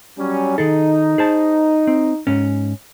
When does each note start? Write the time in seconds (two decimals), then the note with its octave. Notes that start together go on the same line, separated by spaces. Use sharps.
0.18 F#3 G3 C#4
0.58 D#3 D#4 G#4 A4
1.18 G#4 C5 A5
1.87 C4
2.27 G#2 C#4